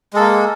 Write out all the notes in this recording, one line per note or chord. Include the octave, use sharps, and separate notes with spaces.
G#3 A#3 A4